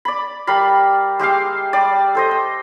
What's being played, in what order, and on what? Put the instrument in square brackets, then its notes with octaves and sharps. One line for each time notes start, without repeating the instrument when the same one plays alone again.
[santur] D5 B5
G3 A#4 F5 B5
G#3 G4 E5 F5
G3 D5
A4 C5 D#5
G5